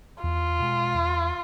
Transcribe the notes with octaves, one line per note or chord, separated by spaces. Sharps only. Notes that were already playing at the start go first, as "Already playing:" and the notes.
E2 F4
B2 G#3
E2